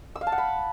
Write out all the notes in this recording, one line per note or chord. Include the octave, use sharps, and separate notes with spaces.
E6
F5
A5
F#5
B5